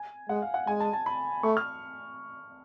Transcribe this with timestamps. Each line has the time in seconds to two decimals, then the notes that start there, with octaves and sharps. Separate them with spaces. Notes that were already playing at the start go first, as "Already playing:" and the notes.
Already playing: G#5
0.29 G#3 F#5
0.42 F5
0.54 F#5
0.67 G#3 G#5
0.80 A5
0.93 A5
1.06 B5
1.43 A3 C#6
1.57 F6